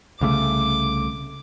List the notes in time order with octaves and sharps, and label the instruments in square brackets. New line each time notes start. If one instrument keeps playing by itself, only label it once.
[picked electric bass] C2 C#3 A3 [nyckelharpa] D6